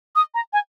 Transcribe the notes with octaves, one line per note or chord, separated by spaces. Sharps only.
D#6
A#5
G#5